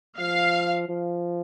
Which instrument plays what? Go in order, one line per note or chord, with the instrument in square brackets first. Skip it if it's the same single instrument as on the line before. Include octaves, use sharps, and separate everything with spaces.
[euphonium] F3 [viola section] F5
[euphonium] F3